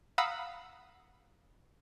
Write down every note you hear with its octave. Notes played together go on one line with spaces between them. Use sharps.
F5 F#5 A#5 B5 D#6 E6